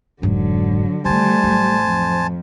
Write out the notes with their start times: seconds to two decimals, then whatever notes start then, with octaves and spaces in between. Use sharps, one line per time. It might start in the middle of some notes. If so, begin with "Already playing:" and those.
0.22 F1 G#2 D3 F#3
1.05 D3 D#3 G3 A3 C5 G#5 A5
1.44 A1 F#3
1.83 F2